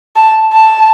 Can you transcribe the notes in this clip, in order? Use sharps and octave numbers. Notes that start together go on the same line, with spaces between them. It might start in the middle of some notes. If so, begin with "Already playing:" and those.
A5
A5